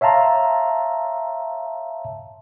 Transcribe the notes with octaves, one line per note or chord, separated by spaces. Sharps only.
C#5 E5 F5 A5 A#5 C6